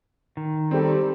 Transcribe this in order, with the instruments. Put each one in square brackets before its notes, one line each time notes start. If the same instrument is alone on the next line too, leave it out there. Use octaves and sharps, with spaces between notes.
[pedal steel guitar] D#3
[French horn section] G3 [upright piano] C4 A4